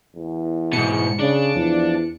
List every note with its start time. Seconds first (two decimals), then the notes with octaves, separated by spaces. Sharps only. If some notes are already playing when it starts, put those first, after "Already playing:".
0.15 E2
0.73 G#2 B2 C#7
1.19 C#3 D4
1.55 E2 F3